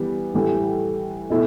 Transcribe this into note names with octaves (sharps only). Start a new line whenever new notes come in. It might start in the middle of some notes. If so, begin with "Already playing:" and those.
Already playing: E3 G3 B3
A2 E3 G3
B2 A3 E4